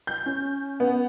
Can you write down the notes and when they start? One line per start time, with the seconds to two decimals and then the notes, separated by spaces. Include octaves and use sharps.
0.07 G6
0.26 C#4
0.80 B3